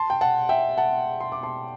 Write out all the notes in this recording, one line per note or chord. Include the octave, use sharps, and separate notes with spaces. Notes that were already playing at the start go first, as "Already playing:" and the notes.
Already playing: A5 C6
G5
F#5 A5
E5 G5
F#5 A5
C6
D6
A5 C6